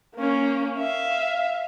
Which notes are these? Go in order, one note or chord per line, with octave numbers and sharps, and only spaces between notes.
A#3 C#4
E5 F5